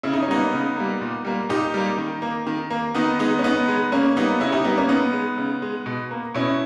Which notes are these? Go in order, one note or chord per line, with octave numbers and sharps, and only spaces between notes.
C#3 E4
D#4
C#4
G3 A#3 B3 D#4
C#3
G3 A#3
A#2
G3 A#3
A#2 D#4 G4
G3 A#3
D#3
A#3
D#3
A#3
D#3 B3 D#4
G#3 B3 D#4
C#4
D#3 B3 D#4
G#3
C#3 A#3 C#4
G3 A#3 B3 D#4
C#3 C#4 E4
D#4 G4
G3 A#3 B3 D#4
A#3 C#4
C#3 B3 D#4
G#3
C#3
G#3
B2
A#3
B2 C#4 E4